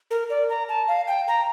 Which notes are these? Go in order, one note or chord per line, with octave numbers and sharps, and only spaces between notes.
A#4
D5
A#5
A5
F5
G5
A#5